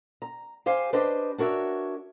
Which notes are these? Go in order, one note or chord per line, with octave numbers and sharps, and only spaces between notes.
A#5
G4 C5 F5 G#5
D4 G4 B4 C5 D#5
D4 F#4 A#4 C#5 E5